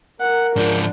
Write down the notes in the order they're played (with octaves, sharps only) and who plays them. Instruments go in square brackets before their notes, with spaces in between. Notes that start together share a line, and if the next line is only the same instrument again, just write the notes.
[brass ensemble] A#4 [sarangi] F#5
[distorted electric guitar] G#2 F3 [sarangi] D4